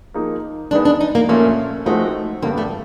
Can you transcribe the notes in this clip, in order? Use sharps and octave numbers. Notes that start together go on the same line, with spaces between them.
F3 A#3 D#4 G#4
D#3 G#3 B3 D4 D#4
D4
D#4
A#3
A#2 F3 A3 A#3 C#4
F3 G#3 A3 C4 D#4 F#4
G2 D3 G3 A#3 B3 D4
A3